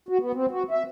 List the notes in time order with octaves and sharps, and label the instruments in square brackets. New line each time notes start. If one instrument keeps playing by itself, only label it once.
[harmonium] F#4
B3
C4
F#4
E5